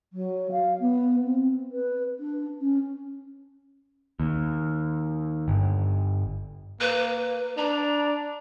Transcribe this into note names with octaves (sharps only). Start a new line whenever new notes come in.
F#3
F5
B3
C4
B4
D4
C#4
D#2
G1
A#3 B4
D4 A#5